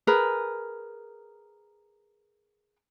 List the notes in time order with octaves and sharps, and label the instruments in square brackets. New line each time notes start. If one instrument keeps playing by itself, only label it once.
[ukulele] G#4 A#4 B4